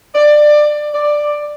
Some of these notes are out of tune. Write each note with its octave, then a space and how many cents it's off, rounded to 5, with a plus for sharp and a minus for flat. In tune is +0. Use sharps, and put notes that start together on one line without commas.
D5 +20
D5 +10